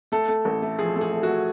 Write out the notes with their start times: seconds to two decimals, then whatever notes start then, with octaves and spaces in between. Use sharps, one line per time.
0.12 A3 A4
0.28 A3
0.45 A1
0.62 A3
0.79 F3 G#4
0.96 A3
1.01 G#4
1.12 A3
1.23 F#4
1.29 A3